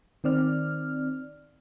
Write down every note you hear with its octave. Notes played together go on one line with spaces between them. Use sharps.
D#3 C4 D5 F6